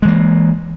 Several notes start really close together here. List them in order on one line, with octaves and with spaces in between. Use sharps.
G#3 E3 A#3